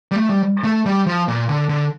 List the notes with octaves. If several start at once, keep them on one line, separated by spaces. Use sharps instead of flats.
G3
A3
G3
A3
G3
F3
A#2
D3
D3